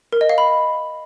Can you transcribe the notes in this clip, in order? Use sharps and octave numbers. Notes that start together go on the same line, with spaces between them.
A#4
D#5
F5
B5